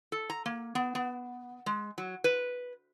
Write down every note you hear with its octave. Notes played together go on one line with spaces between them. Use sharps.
A4
A#5
A#3
B3
B3
G#3
F#3
B4